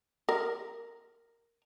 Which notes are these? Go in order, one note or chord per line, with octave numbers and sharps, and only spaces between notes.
A#4